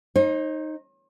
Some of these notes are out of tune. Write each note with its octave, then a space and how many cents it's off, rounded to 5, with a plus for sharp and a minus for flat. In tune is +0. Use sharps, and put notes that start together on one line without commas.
D#4 +0 C5 +45